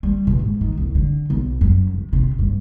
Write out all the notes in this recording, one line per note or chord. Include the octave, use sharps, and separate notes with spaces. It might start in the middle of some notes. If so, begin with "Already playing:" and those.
G3
B2
G#2
D#3
C2
D3
B1
F#2
C3
C3
G2